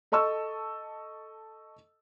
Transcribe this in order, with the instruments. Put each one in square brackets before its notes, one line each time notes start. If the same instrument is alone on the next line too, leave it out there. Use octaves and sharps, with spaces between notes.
[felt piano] A4 D#5 A5 C#6 E6